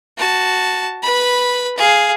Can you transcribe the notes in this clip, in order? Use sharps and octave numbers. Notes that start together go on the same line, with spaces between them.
F#4 A5
B4 B5
G#4 F5